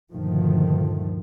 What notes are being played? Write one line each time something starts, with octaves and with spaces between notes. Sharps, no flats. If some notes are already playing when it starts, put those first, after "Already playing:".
D2 G2 A#2 D#3 F3 A3